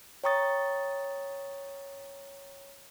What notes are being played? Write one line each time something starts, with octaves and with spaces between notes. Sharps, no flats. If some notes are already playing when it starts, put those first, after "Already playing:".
C#5 G5 A#5 C#6 D#6 A6